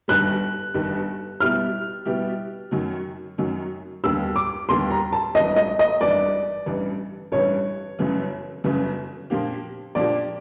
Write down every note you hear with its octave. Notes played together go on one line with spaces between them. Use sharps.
G1 G2 D#3 G3 F#6
G1 G2 D#3 G3
B2 G3 B3 E4 G4 F6
B2 G3 B3 E4 G4
F#2 D#3 F#3
F#2 D#3 F#3
D#2 D3 G3 B3 E6
D6
D#2 D3 G3 B3 C6
A#5
A5
G#1 G2 E3 D#5
D#5
D#5
G#1 G2 E3 D5
A1 G2 E3
A1 G2 E3 C#5
G1 F#2 C#3 E3
G1 F#2 C#3 E3
A#2 F3 A#3 D4 G4
A#2 F3 A#3 D4 G4 D5